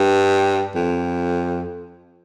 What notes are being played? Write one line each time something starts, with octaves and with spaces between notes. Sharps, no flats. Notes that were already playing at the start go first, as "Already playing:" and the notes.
Already playing: G2
F2